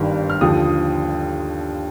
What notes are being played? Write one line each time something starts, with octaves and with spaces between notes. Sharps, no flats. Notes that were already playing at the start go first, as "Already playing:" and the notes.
Already playing: G1 G2 D#3
F6
D#2 D3 F3 D#6